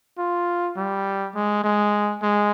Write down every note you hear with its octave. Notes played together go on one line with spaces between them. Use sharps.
F4
G3
G#3
G#3
G#3